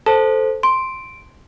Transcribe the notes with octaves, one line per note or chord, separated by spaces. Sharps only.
A4 C5 A5
C6 D7